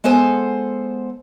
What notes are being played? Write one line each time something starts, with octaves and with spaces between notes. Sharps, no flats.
G#3 B3 A4 C5 G#5